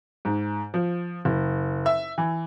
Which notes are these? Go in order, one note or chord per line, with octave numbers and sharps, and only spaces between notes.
G#2
F3
F#1
E5
E3